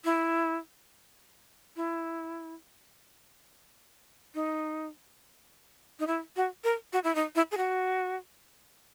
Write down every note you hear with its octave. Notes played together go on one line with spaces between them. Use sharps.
E4
E4
D#4
D#4
E4
F#4
A#4
F#4
E4
D#4
E4
G#4
F#4